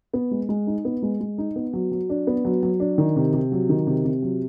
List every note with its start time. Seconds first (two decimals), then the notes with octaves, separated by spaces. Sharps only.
0.14 B3
0.31 G#3
0.49 G#3
0.67 D#4
0.85 B3
1.02 G#3
1.20 G#3
1.38 D#4
1.56 B3
1.73 F#3
1.92 F#3
2.09 D4
2.27 B3
2.45 F#3
2.63 F#3
2.80 D4
2.98 D#3
3.16 C3
3.33 C3
3.52 F#3
3.69 D#3
3.87 C3
4.05 C3
4.22 F#3